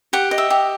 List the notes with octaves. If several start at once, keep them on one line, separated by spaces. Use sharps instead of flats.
G4 F#5
D#5
E5
G4